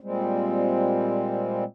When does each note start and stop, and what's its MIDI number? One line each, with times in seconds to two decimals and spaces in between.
0.01 1.64 46
0.01 1.64 55
0.01 1.64 56
0.01 1.64 60